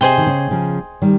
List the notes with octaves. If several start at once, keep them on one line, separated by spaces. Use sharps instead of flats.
C3 G#4 C5 D#5 G5
D#3
C#3
C#3 F3
D#3 G3